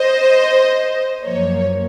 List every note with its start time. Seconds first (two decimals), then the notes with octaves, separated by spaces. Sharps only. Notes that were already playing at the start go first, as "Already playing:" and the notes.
Already playing: C5 D#5
1.23 F#2 F3 A#3 C#5